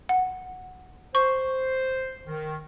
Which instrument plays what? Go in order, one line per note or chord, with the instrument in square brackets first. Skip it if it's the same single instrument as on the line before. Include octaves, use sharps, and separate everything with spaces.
[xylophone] F#5
[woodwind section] C5 [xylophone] C#6
[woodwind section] D#3